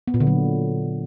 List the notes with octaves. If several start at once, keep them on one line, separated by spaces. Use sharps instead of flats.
B3
A#2
D3
F#3